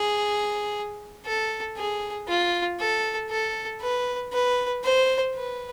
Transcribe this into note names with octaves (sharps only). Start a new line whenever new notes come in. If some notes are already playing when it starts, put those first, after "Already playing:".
Already playing: G#4
A4
G#4
F4
A4
A4
B4
B4
C5
B4